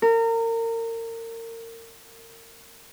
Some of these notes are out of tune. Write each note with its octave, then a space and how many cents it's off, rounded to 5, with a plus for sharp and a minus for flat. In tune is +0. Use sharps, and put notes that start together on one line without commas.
A#4 -30